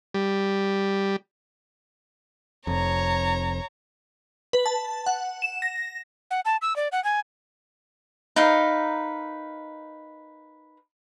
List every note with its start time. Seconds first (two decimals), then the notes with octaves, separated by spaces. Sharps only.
0.14 G3
2.67 F1 F2 C#5 A#5
4.53 B4
4.66 A5
5.06 F#5
5.42 E7
5.62 A#6
6.31 F#5
6.45 A5
6.62 E6
6.76 D5
6.92 F#5
7.04 G#5
8.36 D#4 A#4 B4 F5